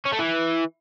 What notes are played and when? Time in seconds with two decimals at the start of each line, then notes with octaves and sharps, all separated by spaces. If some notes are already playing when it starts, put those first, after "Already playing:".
0.05 C#4
0.12 A3
0.19 E3